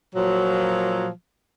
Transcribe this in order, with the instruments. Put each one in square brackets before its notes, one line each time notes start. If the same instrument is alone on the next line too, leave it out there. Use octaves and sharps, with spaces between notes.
[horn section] A#2 F3 F#3